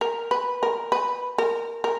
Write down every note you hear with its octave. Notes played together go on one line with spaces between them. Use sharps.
A#4
B4
A#4
B4
A#4
A#4